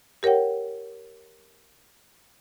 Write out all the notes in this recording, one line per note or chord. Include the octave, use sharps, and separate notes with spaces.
G4 A#4 C#5 F#5 G5